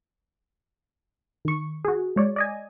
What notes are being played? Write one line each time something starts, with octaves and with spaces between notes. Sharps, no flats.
D#3 C#6
F#4 G#4
G#3 C#5 D5
D5 D#5 G#5